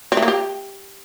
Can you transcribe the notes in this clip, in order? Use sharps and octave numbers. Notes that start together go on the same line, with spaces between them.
C4
A3
A#3
G4